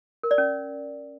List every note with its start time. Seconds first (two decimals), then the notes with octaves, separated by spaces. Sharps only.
0.23 A#4
0.31 D5
0.38 C#4